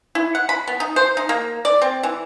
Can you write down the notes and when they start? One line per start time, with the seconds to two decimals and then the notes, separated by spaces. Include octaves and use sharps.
0.15 E4
0.35 F#5
0.49 B5
0.68 B3
0.80 D#4
0.96 C5
1.17 D#4
1.29 A#3
1.65 D5
1.82 C4
2.03 E3